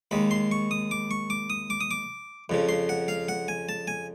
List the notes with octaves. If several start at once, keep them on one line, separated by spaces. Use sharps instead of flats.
D#2 D#3 G#3 B5
C6
C#6
D#6
D6
C#6
D6
D#6
D6
D#6
D6
F2 C#3 F3
C6
F#5
F5
F#5
G#5
A5
G#5